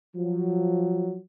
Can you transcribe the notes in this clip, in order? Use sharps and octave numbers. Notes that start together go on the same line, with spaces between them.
F3 F#3